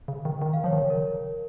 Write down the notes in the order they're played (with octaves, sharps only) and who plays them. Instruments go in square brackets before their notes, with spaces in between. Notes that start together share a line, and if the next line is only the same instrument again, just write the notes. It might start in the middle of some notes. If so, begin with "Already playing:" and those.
[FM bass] C#3
D#3
D#3
[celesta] F5
[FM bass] F3 [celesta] C#5
[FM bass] D#3
[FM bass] C#3 [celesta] C#5
[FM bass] C3 [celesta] A#4